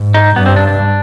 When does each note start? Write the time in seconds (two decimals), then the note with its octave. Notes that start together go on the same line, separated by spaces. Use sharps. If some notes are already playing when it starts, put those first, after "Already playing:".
Already playing: G#2
0.14 D#4
0.36 G2 B3
0.46 C4
0.56 D4
0.67 D4